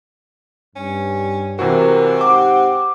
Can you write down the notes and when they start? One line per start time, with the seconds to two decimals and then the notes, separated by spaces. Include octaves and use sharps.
0.76 G2 C#4
1.59 C3 E3 C4 F#4 A#4
2.21 G#2 G4 F#5 D6